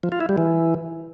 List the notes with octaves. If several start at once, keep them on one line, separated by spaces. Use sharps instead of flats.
F3
F4
E4
G3
E3